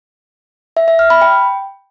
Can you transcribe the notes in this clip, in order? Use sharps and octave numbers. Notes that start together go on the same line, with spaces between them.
E5
E5
F6
B5
G5